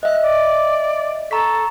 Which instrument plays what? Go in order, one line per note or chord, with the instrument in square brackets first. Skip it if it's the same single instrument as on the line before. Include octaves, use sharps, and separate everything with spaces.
[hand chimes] D#5 E5 [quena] F#6
[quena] D5
[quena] A4 [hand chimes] A#5 C#6 B6